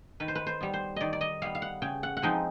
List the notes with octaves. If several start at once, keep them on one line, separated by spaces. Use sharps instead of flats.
D#3 B4
C5
B4
C5
G3 B3
C5
D#3 D5 D#5
D5
D#5
G3 B3 F5
F5
F#5
C#3 G5
F#5
F#5
F3 G#3 C4 D#4 G5